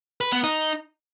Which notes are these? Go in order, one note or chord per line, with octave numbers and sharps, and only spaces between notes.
B4
B3
D#4